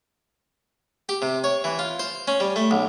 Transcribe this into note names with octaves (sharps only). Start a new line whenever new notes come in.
G4
C3
C#5
E3
F4
C5
C#4
G3
A3
B1